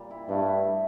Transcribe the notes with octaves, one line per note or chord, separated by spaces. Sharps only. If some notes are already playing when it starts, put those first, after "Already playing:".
Already playing: A#2 G3
E4
G2 A3
E4
A3